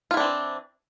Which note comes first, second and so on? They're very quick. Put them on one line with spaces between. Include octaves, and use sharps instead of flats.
F4 E4 D4 C4 E3